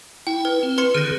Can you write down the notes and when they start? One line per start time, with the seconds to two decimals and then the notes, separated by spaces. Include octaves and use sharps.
0.27 E4 G5
0.45 B4
0.63 C4
0.78 B4 C6 C#7
0.95 D3 D#3 G#4 F6 A#6